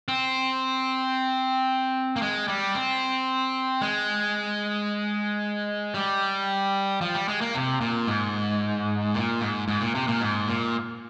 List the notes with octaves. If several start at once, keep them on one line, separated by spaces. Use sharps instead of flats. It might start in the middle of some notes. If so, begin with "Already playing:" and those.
C4
A#3
G#3
G3
C4
G#3
G3
F3
G3
G#3
A#3
C3
A#2
G#2
A#2
G#2
G#2
A#2
C3
A#2
G#2
A#2